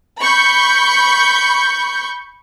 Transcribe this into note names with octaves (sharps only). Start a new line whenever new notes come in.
B5 C#6 G6